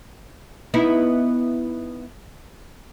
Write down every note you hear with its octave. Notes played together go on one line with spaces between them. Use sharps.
B3 D#4 E4